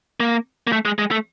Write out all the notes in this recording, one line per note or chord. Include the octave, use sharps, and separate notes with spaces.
A#3
A#3
A3
G#3
G#3
A3